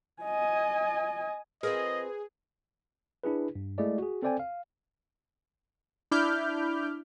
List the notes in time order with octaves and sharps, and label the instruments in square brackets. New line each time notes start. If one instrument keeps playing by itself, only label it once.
[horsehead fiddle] D#5 G#5
[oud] C4 F4 A#4 [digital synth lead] G#4 [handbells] B4 [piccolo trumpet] D#5
[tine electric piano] D4 E4 G#4 B4
G2
G#3 A3 E4 G#4 D5 D#5
F#4 G#4
C4 A4 C5 D5 G5 G#5
F5
[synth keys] D4 E4 B5 D6 F6 G6